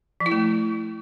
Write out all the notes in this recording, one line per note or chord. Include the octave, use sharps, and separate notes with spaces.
F3
E4
A3